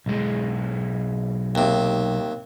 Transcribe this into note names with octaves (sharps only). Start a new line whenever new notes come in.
B1 G#3
D#2 C3